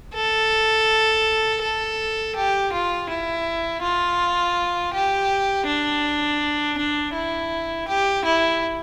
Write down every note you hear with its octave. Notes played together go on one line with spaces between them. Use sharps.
A4
A4
G4
F4
E4
F4
G4
D4
D4
E4
G4
E4